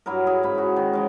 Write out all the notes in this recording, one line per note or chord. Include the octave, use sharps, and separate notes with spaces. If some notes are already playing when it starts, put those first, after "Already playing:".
G2 F#3 E4 A#4
E4 G#4
G#2 C#3 B5
E4 F#4
D#3
F3 G#3 C#4